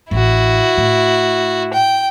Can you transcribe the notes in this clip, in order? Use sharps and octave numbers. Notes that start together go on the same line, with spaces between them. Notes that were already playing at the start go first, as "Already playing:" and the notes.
A1 E4 F#4
A2
G5